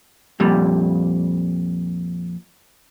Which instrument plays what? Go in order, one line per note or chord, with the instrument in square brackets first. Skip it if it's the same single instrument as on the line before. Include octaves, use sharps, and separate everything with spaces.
[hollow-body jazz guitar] F2 A#2 G3